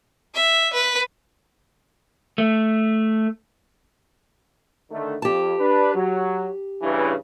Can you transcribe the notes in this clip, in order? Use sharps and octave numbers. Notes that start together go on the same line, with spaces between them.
E5
B4
A3
D3 D#3 A3
F2 G4 A5
D4 B4
F#3
G2 C#3 E3